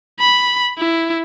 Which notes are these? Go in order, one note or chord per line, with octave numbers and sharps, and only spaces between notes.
B5
E4